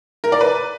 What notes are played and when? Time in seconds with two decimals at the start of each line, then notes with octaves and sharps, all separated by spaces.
0.24 A#4
0.32 D5
0.41 B4